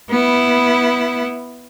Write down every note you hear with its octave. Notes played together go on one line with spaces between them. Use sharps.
B3 E4